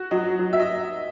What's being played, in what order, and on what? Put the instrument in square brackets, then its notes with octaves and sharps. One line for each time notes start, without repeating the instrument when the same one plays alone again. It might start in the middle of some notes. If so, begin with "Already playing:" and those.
Already playing: [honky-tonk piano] F#4
[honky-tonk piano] F#3 [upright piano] D#5
[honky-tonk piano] F#3
[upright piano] E5
D#5